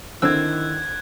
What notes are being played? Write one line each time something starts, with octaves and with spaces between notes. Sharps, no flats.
D3 D#3 C4 E4 E6 F#6 G#6